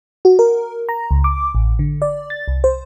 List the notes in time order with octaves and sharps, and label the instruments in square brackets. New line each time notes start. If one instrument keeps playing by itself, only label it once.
[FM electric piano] F#4
A#4
A#5
C#2
D6
A1
D3
D5
A6
C2
C5